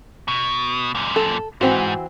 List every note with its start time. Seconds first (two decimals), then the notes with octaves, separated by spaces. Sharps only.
0.28 B2
0.95 F#2 A#2
1.16 A4
1.61 G#2 E3 C4 F#4